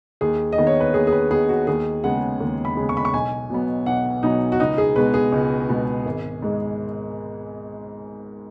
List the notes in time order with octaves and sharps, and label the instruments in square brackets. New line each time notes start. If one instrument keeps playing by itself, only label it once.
[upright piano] D#2 G#4
D#5
D#3 B3
C#5
B4
D#2 G#4
G#4
B4
D#3 B3 G#4
F#4
D#2 G#4
C#3 G#3 B3 F#5
D#2
B5
C#3 G#3 B3
C#6
B5
C#6
B1 G#5
B2 F#3 B3
B1 F#5
B2 F#3 B3 D#4
F#4
C#2 D#4
G#4
B2 G#3 B3 B4
G#4
C#2
B2 G#3 B3
G#1
G#2 G#3